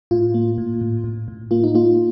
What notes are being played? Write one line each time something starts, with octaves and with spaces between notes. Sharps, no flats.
A2 F4
A#3
A2
A2
A2
A2
A#3 F4
D#4
A#3 F4